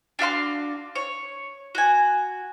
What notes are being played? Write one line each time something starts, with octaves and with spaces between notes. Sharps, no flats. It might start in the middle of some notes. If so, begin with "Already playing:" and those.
D4 F#4 F5 C6
C#5
F#4 G#5